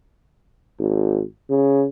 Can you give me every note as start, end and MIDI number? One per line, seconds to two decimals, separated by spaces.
0.79 1.22 32
1.50 1.86 49